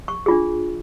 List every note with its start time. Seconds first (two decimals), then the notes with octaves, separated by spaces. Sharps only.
0.08 C#6
0.26 D4 F4 G#4